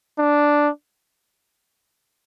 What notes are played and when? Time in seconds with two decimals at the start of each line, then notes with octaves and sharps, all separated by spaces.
0.19 D4